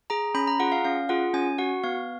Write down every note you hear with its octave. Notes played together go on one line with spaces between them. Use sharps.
G#4 A#5
C#4 B5
A#5
F4 G#4 F#5
F5
C#4 F5
F4 G#4 F#5
C#4 G#5
F#4 F#5
B3 F5